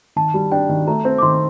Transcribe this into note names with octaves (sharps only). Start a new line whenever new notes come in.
D#3 A5
G3
D4 G5
D#3
A3 A#5
C4
D6
D#3 C6